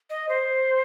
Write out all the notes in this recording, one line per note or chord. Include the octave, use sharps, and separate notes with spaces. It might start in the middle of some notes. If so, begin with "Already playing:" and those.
D#5
C5